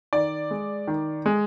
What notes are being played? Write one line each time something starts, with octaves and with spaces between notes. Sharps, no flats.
D#3 D5
G#3
D#3
G#3